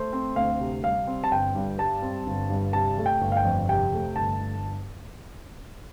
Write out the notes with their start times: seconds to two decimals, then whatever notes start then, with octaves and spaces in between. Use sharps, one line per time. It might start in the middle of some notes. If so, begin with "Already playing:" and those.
Already playing: A3 C5
0.13 C4
0.36 D2 F5
0.60 C3
0.83 G3 F5
1.07 C4
1.24 A5
1.31 G1 G5
1.55 G2
1.78 G3 A5
2.02 C4
2.26 G1
2.50 G2
2.73 C3 A5
2.98 A3
3.06 G5
3.21 G1
3.32 F5
3.37 G5
3.45 F2
3.69 C3 G5
3.93 A3
4.16 G1 A5